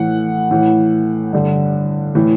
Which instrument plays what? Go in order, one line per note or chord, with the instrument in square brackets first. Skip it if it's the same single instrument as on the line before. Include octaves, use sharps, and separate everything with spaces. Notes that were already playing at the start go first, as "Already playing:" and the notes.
Already playing: [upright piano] A2 E3 F#5
A2 E3
G2 D3
A2 E3